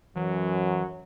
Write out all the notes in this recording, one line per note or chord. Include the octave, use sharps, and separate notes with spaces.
F#2 E3 F#3